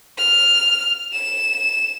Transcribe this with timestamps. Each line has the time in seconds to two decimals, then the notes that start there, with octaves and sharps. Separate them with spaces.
0.18 F6
1.13 E7